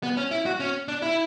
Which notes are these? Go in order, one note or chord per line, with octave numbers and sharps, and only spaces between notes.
B3
C#4
E4
F#4
C#4
D4
E4